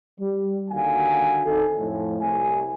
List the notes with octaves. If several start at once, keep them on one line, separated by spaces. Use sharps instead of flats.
G3
D#2 D3 F#4 F5 G#5
D#3 C4 D#4 A4
F2 A2
C2 G#5